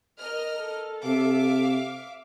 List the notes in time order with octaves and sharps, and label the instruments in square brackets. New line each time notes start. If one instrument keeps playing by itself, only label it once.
[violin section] A#4 D#5 F6
[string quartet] A4
[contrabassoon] C3 [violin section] E5 F5 D6